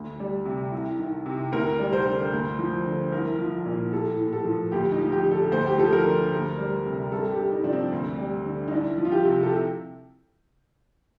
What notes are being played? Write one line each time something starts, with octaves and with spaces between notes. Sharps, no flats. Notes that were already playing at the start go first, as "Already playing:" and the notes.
Already playing: D2
G3
C3
C2
D#3
C3
D2 A#4
G3
C5
D3
D2
F3
D3
C2 A#4
F3
A#2
A2 A4
A2
A4
F3
D2 G4
D#4
F3
G4
D3
A4
D2 C5
G4
F3 A4
A#4
D3
D2
G3
C3
G2 A4
G4
G2
D#4
F3 D4
C4
D2
G3
D3
D#4
C2 D4
F3
F4
G4
C3
A4